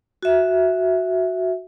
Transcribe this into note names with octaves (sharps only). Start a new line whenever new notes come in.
F#4 E5